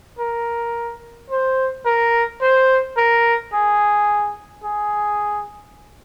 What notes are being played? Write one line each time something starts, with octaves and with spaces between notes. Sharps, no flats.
A#4
C5
A#4
C5
A#4
G#4
G#4